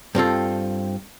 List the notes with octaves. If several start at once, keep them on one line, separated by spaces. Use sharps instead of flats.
G2 C4 F4 A4